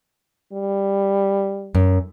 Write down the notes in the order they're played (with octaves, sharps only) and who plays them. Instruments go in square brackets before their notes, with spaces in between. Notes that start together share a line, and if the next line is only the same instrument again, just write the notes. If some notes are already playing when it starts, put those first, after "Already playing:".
[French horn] G3
[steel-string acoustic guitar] F#2